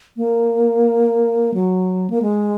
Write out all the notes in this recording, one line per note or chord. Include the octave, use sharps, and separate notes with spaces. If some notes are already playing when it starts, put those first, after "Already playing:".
A#3
F#3
A#3
G#3